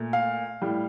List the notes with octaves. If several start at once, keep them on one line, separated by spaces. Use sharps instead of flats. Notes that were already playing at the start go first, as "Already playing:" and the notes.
Already playing: A#2 A3
F5
A2 G3